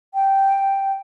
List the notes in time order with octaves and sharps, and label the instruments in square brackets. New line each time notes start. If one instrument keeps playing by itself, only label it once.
[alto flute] G5